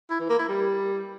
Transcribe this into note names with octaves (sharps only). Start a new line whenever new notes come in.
E4
E3
A#3
E4
G3